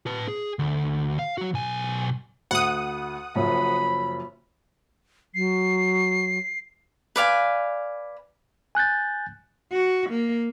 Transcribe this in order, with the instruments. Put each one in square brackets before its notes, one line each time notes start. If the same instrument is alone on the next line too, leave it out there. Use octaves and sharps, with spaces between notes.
[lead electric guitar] B4 A5
G#4
D2
F5
F#3 F#4
B1 G#5
[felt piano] D2 [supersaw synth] F#5 D#6
[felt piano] F#1 F#2 F3 [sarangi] B5
[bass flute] F#3 [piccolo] C7
[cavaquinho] B4 D5 F5 G#5
[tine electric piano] G#5 F#6 G6 A6
[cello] F#4
A#3